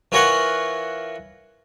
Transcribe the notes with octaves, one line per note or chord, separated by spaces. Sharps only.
E3 F4 A#4 C#5 F#5 C6